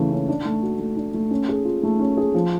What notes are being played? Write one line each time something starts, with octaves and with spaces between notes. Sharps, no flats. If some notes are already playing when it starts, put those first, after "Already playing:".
Already playing: C#3 E3 A3 C#4
C#4
D4
A3
F#4
A3
D4
A3
C#4
G#4
F4
A3
C#4
G#4
F3